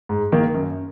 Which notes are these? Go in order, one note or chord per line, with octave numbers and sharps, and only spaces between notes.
G#2
D#3 A#3
F#2